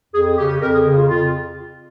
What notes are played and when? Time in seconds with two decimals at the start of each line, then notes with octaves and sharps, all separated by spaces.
0.14 F2 G#4
0.26 G#4
0.37 C#3 G4
0.49 G4
0.61 F2 A#4
0.73 G#4
0.85 C#3
0.97 F4
1.08 F2 F4